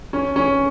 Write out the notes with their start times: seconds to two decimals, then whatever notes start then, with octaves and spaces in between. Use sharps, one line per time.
0.13 C#4
0.36 C#4